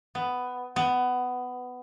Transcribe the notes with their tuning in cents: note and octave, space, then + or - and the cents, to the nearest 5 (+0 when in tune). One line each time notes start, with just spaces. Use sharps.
B3 +10
B3 +15